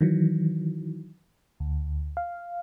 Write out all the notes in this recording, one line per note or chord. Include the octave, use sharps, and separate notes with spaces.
D#3 E3 F#3
D2
F5